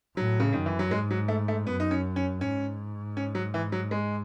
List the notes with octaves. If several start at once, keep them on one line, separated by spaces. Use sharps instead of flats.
A2 F#3
C#3
F#2 D#3
E3
F#3
G#2 G#3
F#3
A3
A3
F#2 B3
D#4
C#4
C#4
G#2 C#4
C#4
F#3
E3
F#3
G#3